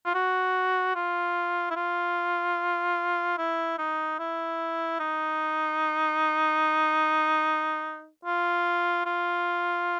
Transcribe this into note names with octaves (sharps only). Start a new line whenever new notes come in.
F4
F#4
F4
E4
F4
E4
D#4
E4
D#4
F4
F4